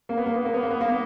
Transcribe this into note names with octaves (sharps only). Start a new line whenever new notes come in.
A#3
B3
A#3
B3
A#3
B3
A#3
B3
A#3
B3